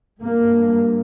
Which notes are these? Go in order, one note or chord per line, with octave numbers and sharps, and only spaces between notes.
G2 A#3